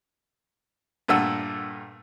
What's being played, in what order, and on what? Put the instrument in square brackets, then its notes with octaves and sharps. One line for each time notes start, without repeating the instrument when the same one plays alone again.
[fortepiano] G2 A#2 A3 F#5 E6